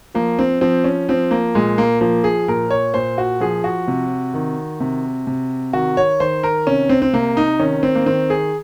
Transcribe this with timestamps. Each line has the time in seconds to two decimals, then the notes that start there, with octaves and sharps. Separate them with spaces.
0.15 F3 A#3
0.39 C4
0.61 F3 C4
0.84 C#4
1.09 F3 C4
1.31 A#3
1.55 A#2 G#3
1.78 A#3
2.01 F3 A#3
2.24 G#4
2.48 A#2 A#4
2.70 C#5
2.94 A#2 C5
3.18 F#4
3.40 F3 G#4
3.64 F#4
3.88 C3
4.34 D#3
4.80 C3
5.27 C3
5.73 D#3 F#4
5.97 C#5
6.20 D#3 C5
6.43 A#4
6.67 C3 C#4
6.89 C4
7.02 C4
7.13 C3 A#3
7.37 D#4
7.59 D#3 C#4
7.83 C4
7.95 A#3
8.06 D#3 C4
8.30 G#4